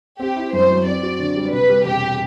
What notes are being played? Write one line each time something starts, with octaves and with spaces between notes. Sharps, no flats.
C4 G4
E4
F#2 C5
F#3
C4 D5
F#4
D3
G3
C3 B4
G3
E1 G4